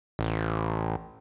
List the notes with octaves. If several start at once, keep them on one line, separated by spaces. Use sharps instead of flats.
A1